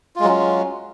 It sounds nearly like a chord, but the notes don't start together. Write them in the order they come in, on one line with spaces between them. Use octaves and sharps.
F4 G#3 F#3 C#4